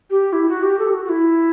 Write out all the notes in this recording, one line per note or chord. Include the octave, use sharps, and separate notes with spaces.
G4
E4
F#4
G4
A4
G4
F#4
F#4
E4